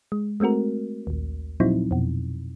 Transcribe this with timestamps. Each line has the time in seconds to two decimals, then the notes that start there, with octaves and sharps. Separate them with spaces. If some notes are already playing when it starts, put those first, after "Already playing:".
0.12 G#3
0.40 G#3 A3 C4 F#4 A#4
1.07 A#1 D#2
1.60 A#2 F3 F#3 C4 D#4 E4
1.91 F2 B2